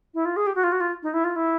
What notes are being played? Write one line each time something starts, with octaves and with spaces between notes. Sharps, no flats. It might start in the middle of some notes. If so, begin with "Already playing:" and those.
E4
F4
G#4
G4
F#4
F4
F#4
F4
D#4
E4
F4
E4